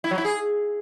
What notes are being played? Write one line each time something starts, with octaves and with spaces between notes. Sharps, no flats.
E4
F#3
E4
G#4